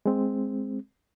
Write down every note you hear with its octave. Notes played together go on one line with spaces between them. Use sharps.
G#3 C4